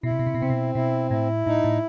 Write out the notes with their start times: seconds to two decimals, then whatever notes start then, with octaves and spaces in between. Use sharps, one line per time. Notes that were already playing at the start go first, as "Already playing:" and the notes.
0.03 B2 E4
0.11 C3
0.19 B2
0.26 C3
0.34 B2
0.39 C3 C4
0.50 B2
0.75 B2 E4
1.11 A2 E4
1.46 A2 D#4
1.64 A2